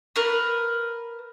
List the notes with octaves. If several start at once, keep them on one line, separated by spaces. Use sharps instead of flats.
A#4 B4